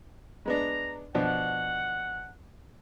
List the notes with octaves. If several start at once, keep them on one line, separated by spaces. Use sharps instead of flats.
G#3 B3 D4 A#5
B2 F3 D4 F#5